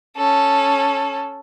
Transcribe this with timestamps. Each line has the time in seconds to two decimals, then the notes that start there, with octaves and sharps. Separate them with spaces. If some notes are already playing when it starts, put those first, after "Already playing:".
0.17 C#4 A4